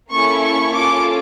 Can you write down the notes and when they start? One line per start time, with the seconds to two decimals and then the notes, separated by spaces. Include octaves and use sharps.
0.11 A#3 C#4 E4 A4 C#6
0.42 C#6
0.72 C#4 F4 A4 D6